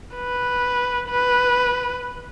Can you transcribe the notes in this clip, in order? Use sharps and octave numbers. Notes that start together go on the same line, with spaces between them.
B4
B4